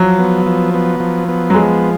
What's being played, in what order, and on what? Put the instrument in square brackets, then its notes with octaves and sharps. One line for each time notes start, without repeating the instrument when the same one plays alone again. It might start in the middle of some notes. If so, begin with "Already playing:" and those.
Already playing: [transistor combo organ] F3 [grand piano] F#3
[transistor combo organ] B3
F3
B3
F3
B3
[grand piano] F#3
[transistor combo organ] F3 [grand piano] G#3